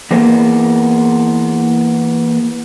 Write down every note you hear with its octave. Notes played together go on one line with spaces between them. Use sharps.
E3 A#3 B3 G#4 C5